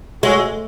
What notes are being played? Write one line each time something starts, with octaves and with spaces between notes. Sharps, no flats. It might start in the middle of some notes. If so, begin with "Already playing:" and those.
G#3 F#4 C#5 E5